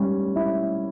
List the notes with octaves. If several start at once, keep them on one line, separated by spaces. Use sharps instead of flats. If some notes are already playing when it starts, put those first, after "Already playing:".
Already playing: G3 C#4
E4